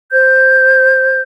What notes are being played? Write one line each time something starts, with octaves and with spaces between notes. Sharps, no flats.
C5 G6